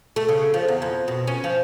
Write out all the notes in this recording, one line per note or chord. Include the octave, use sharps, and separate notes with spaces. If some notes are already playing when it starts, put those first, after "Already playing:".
A3
C#3
F3
E2
F2
B2
C#4
F3